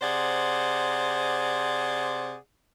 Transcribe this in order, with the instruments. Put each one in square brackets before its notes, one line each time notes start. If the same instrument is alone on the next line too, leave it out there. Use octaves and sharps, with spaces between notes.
[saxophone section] C3 G#4 C5 D5 F#5